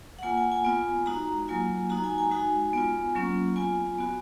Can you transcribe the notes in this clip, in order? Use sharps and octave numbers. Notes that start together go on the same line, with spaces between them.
F#5
A#3 F4 G#5
G#5
G#5
B3 F4
G#3 D#4 F#4 A#5
F#3 A#3 F4 G#5
G#3 D#4 F#4 A#5
G#5
G#5
G#3 D#4 F#4 G#5
B3 F4
F#3 A#3 C#4 F4
B3 F4 G#5
B3 F#4